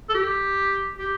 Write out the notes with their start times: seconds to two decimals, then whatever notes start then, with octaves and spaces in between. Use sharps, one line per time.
0.09 A4
0.14 G4
0.98 G4